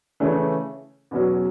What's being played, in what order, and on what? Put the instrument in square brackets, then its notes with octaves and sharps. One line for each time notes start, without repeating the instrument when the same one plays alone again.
[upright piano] C#3 E3 A3 C#4
E2 B2 F#3 C#4